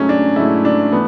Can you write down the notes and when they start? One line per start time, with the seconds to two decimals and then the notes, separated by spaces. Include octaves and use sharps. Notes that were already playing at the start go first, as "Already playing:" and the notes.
Already playing: G#2 F#3 A3 C#4
0.09 D4
0.36 G#2 F#3 A3 E4
0.65 D4
0.92 E3 A3 B3